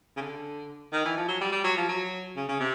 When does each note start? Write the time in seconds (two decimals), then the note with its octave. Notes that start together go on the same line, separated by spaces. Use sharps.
0.17 C#3
0.21 D3
0.93 D#3
1.05 E3
1.17 F3
1.28 F#3
1.41 G3
1.52 G3
1.64 F#3
1.77 F3
1.89 F#3
2.36 C#3
2.48 C#3
2.60 C3